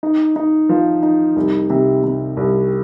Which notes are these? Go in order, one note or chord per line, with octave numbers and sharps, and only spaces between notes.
D#4
D#4
F3
D#4
C2
C3
C3
C2